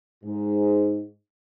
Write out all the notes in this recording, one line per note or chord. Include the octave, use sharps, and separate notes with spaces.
G#2